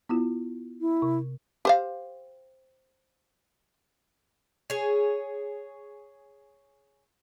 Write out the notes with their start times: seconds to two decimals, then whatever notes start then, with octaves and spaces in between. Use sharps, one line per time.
0.09 B3 E4 F4
0.81 E4
1.02 C3
1.65 G4 C5 F5
4.70 G#4 C#5